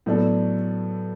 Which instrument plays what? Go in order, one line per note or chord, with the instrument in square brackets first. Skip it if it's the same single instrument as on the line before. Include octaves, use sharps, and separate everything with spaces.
[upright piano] A2 F#3 B3 D4 A4